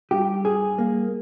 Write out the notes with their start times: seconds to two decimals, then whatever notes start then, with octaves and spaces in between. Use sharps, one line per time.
0.11 G2 G4
0.45 G3 G#4
0.78 A#3